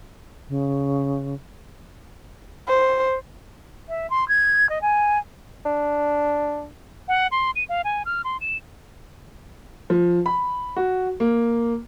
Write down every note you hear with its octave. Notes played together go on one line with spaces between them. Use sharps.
C#3
C5
E5
C6
G#6
D#5
G#5
D4
F#5
C6
D#7
F5
G#5
F6
C6
E7
F3
B5
F#4
A#3